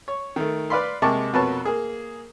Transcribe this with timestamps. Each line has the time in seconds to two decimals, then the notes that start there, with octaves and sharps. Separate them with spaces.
0.08 C#5
0.36 D#3 A3
0.70 B4 D5 F5 B5 C6
1.02 C3 G#3 A#3 A5 C#6 D6
1.33 F2 B2 A#4 B4 C#5 A5
1.65 A#3 G#4